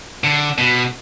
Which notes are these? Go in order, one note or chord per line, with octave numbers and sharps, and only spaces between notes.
D3
B2